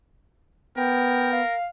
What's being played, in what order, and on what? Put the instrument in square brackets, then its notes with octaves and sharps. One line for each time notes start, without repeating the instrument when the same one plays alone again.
[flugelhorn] B3 [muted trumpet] A#4 [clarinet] G5
[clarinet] F5